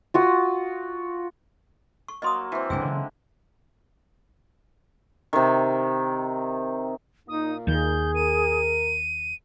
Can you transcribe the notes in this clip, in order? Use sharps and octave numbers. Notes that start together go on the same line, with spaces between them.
F4 F#4 D#6
C#6
F#3 A#3 D#5 C6 D#6
E3 C4
F#1 C2 G2 D3 G#3 E5 G5 G#5
C#3 E3 F#3
C3 D#3
A#2 A#3 D#4 D#6
D#2 D#3 G#4 G6
A#4 D#7